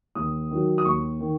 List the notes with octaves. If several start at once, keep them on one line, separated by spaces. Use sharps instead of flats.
D#2 D#6
D#3 F#3
D#6
D#2 C#6
D#3